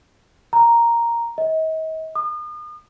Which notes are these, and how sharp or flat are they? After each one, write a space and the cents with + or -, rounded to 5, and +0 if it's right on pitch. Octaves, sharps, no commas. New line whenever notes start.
A#5 +0
D#5 +40
D#6 -40